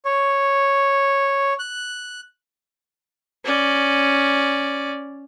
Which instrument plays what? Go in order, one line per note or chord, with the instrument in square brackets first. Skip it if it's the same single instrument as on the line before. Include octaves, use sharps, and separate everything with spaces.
[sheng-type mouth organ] C#5
F#6
[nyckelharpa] C#4 D5